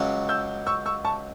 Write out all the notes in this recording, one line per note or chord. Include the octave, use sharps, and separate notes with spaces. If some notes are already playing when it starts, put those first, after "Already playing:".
Already playing: C#2 C#3 F#3
E6 G6
C#6 E6
C#6 E6
A5 C#6